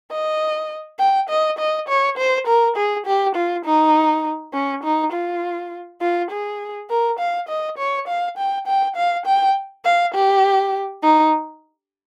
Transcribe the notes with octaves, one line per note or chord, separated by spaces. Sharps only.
D#5
G5
D#5
D#5
C#5
C5
A#4
G#4
G4
F4
D#4
C#4
D#4
F4
F4
G#4
A#4
F5
D#5
C#5
F5
G5
G5
F5
G5
F5
G4
D#4